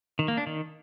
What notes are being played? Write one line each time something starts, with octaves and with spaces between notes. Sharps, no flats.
D#3
A#3
D4
D#3